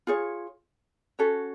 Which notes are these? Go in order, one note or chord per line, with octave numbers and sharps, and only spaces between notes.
F4 G#4 C#5
C#4 F#4 A4 C#5